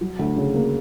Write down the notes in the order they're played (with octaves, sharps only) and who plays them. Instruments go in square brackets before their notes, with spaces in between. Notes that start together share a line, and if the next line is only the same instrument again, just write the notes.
[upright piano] F#3
D2
C#3
A#3